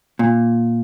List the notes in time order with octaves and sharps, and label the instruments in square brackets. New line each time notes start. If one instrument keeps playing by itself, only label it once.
[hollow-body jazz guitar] A#2